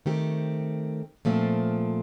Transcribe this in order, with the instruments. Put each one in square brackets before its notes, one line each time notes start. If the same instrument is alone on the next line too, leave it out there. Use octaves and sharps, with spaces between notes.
[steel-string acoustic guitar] D#3 A3 C4 G4
A#2 F3 A3 C4